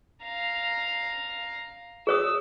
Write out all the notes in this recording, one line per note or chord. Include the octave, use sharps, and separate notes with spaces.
F5 A#5
G#4 C#5 D#6 E6